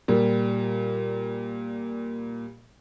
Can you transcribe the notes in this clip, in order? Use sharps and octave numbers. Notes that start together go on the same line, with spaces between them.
A#2 G3